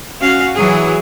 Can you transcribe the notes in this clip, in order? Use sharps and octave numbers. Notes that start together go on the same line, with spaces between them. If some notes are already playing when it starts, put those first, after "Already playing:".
C#4 F#4 F5
E3 F#3 G#4